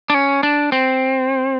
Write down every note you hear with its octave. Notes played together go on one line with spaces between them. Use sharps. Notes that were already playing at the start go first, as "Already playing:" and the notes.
D4
C#4
D4
C4